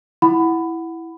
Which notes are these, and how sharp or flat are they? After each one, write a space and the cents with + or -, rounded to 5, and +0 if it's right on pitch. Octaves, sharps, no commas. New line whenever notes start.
E4 +0 F#5 +0 B5 +20